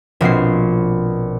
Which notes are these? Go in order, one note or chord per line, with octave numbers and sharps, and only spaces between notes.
A#1 B2 C4 C7